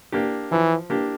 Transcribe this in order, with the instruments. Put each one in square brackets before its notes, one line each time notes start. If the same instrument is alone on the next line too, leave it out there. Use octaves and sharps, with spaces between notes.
[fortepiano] A#3 D4 G4
[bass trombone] E3 [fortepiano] F3
[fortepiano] A#3 D4 G4